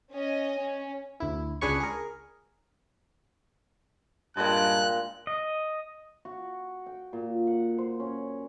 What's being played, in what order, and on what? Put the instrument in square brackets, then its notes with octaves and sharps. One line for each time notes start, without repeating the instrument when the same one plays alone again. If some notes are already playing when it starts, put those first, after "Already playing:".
[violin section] C#4 D#5
C#4
[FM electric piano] D2 E4
C#2 D4 G#4 B4 C#5 C#6
G#4 A#4
[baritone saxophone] G2 [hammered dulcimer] A#2 G#3 [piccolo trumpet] F#6
[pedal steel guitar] D#5
[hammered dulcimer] F#4
G5
A#2
F#5
C5
C#4